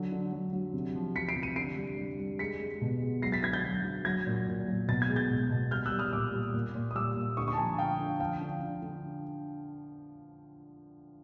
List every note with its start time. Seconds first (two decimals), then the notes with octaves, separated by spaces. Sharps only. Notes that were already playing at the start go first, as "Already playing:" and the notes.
Already playing: D3 F#3
0.12 D3
0.32 F#3
0.53 F#3
0.73 C3
0.95 F3
1.15 F3 B6 C#7
1.29 C7 D7
1.36 C3
1.43 C#7 D#7
1.56 D3 C7 D7
1.77 G3
1.98 G3
2.20 G3
2.39 G#3 B6 C#7
2.60 G#3
2.81 B2
3.02 G#3
3.22 F#3 A#6 C7
3.32 A6 B6
3.43 D3 G#6 A#6
3.53 G6 A6
3.64 F#3
3.85 F#3
4.05 F#3 G#6 A#6
4.26 A#2
4.48 A#2
4.68 F#3
4.88 B2 A6
5.02 G#6
5.09 G#3
5.16 G6 A6
5.30 B2
5.50 B2
5.71 G3 F6 G6
5.86 E6 F#6
5.92 G3
5.99 D#6 F6
6.13 A#2 D6 E6
6.33 G3
6.54 A#2
6.75 A#2
6.91 D#6
6.95 G3 D6 E6
7.16 A#2
7.37 D3 C#6 D#6
7.48 C#6 D#6
7.53 A5
7.58 F3 G#5 A#5
7.78 D3 F5 G5
7.99 D3
8.20 F3 F5 G5
8.41 D3
8.61 D3
8.82 D3